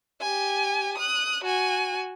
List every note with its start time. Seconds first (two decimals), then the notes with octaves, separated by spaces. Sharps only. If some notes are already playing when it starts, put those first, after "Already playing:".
0.21 G4 G#5
0.98 D#6 F#6
1.44 F#4 G#5